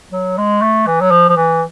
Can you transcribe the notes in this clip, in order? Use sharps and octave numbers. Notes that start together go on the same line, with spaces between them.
F#3
G#3
A3
E3
F#3
F3
F3
E3